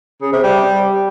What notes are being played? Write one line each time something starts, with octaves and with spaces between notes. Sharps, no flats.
C#3
C3
G3